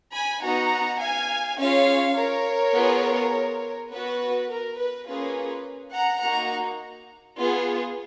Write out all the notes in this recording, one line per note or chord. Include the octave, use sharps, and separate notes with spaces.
G#5 B5
B3 D#4 F#4 F#5 A#5
F5 G#5
C#4 F4 G#4 C#5 F5
A#4 C#5
B3 F4 G#4
B3 F#4 B4
A#4
B4
A#3 C#4 F4 G#4 B4
F#5 A#5
A#3 D#4 F#4 F#5 A#5
B3 F4 G#4